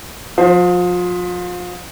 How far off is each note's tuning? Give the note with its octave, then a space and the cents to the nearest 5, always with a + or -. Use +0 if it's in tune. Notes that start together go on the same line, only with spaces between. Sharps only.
F3 +35 C5 +0